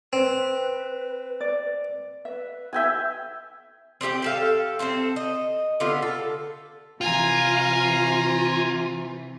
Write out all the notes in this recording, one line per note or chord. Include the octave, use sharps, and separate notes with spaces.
C4 B4
D5
B4 E5
E5 G5 G#5 E6
C4 D4 G4 G5
G4 A4 F5
C4 E4 A4 C5
D#5
D3 B3 F4 G4
A4
C3 E3 F4 G#5 A#5